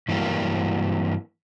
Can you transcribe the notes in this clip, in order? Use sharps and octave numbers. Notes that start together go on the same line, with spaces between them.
G2 E3 F#3 A#3 G4 A#4